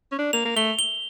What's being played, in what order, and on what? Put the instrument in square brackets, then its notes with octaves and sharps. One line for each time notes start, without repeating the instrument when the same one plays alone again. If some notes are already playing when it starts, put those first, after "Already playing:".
[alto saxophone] C#4
D4
[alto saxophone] A#3 [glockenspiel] F7
[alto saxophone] A#3
[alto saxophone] A3 [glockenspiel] G7
[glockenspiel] G7